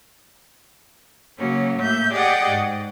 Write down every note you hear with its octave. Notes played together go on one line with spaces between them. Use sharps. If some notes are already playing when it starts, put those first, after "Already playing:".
C#3 F#3 A#3 C#4
A2 A#3 E5 G6
G4 G#4 D5 D#5 F#5 G5
G#2